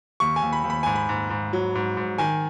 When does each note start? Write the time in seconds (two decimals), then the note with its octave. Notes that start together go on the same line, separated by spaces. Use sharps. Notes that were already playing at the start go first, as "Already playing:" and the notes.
0.20 D#2 C#6
0.36 G#5
0.42 D#2
0.53 B5
0.64 D#2
0.70 B5
0.83 G#2 G#5
0.95 B5
1.09 G#2
1.30 G#2
1.53 F#3
1.75 G#2
1.97 G#2
2.18 D#3 G#5